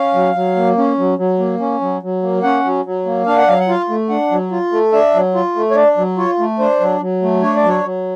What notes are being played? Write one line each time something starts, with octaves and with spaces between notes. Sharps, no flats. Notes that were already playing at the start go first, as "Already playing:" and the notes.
Already playing: C#4 F5
F#3
F#3
A#3
C#4
F#3
F#3
A#3
C#4
F#3
F#3
A#3
C#4 F#5
F#3
F#3
A#3
D4 F5
F#5
F#3 F5
F#5
F4 F5
A3
D4 F#5
F#3
F4
A3
D4 E5
F#3
F4
A3
C#5
D4 D5
F#3
F4 C#5
A3
D4 C5
F#3
F#3
A3
D4 C#5
D5
F#3
C#5
F#3